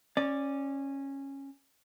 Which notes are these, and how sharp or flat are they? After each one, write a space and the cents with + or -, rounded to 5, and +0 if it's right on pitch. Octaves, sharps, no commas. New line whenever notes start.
C#4 -15 D5 +5